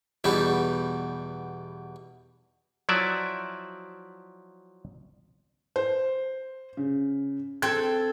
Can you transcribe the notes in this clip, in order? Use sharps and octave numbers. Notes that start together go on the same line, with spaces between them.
E2 B2 G3 D#4
F3 F#3 E4 D5 E5
C5
C#3
C4 A4 G#6